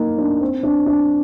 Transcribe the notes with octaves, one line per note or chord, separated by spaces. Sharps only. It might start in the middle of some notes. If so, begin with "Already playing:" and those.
Already playing: A#3 D#4
D4
C4
D4
D4